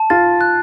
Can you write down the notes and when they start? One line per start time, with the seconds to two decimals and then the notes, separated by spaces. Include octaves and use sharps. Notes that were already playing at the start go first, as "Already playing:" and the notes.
Already playing: A5
0.10 F4 A6
0.41 F#6